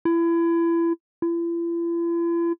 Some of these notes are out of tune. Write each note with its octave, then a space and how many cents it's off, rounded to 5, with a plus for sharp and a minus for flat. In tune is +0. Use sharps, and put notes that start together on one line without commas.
E4 +30
E4 +45